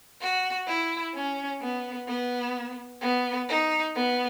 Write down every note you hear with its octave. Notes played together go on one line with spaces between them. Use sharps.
F#4
E4
C#4
B3
B3
B3
D#4
B3